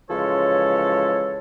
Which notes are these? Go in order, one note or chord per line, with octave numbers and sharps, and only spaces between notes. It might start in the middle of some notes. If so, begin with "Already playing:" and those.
C#3 E3 F3 G#3 A4 C#5